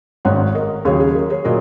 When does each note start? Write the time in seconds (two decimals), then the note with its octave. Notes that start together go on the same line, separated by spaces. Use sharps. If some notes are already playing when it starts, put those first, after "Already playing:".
0.25 G#1 G#2 D#3 C#5 F#5
0.55 A#4 D#5
0.85 D#2 C#3 F#3 G#4 C#5
1.00 G#4
1.15 A#4
1.30 G#4 C#5
1.45 A#2 F#3 A#4 D#5